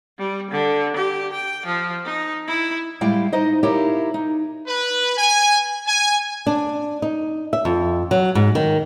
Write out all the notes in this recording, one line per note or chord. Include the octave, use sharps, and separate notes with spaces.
G3
D3
G4
G5
F3
D#4
E4
A2 G3 G#3 E4 F5 G5
D#4 C5 D#5
D#4 E4 G4 A#4 C#5 F5
D#4
B4
G#5
G#5
D4
D#4
E5
F2
F#3
G#2
D#3